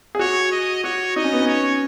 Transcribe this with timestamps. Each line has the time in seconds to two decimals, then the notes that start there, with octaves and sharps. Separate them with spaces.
0.15 G#4
0.19 F#4 C#5
0.52 D#5
0.84 F#4 C#5
1.16 D#4 D#5
1.24 C#4
1.33 B3
1.41 C#4
1.48 C#5